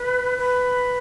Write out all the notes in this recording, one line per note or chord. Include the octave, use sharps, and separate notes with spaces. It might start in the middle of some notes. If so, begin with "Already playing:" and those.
Already playing: B4
B4